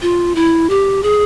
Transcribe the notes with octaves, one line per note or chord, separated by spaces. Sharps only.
F4
E4
G4
G#4